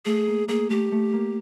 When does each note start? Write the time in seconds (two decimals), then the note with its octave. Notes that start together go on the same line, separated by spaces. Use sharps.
0.05 A3 G#4
0.27 A#3
0.48 A#3 G#4
0.70 A3 G4
0.92 A3
1.13 A#3